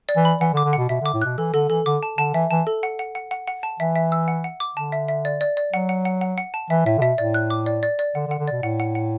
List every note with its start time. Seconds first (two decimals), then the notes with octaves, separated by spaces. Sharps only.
0.09 D5
0.17 E3
0.25 B5
0.41 E3 F#5
0.54 D3
0.57 D6
0.65 D3
0.73 B2 F#5
0.89 B2 E5
1.01 D3
1.06 D6
1.14 A2
1.22 B2 F#6
1.38 E3 A4
1.54 D3 A4
1.70 E3 A4
1.86 D3 D6
2.03 A5
2.18 D3 A5
2.34 E3 E5
2.51 E3 A5
2.67 A4
2.83 F#5
2.99 F#5
3.15 F#5
3.31 F#5
3.48 F#5
3.63 A5
3.80 E3 E5
3.95 E5
4.12 E6
4.28 F#5
4.44 F#5
4.60 D6
4.76 D3 A5
4.92 E5
5.08 E5
5.25 D5
5.41 D5
5.57 D5
5.73 F#3 F#5
5.89 F#5
6.05 F#5
6.21 F#5
6.38 F#5
6.54 A5
6.70 E3 E5
6.86 A2 E5
6.98 D3
7.02 B2 E5
7.18 A2 D5
7.34 F#6
7.50 D6
7.66 D5
7.83 D5
7.99 D5
8.15 D3 F#5
8.27 D3
8.31 F#5
8.39 D3
8.48 B2 D5
8.63 A2 F#5
8.80 F#5
8.95 F#5